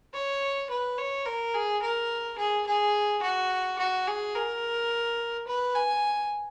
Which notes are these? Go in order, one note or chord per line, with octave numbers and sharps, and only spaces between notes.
C#5
B4
C#5
A#4
G#4
A#4
G#4
G#4
F#4
F#4
G#4
A#4
B4
G#5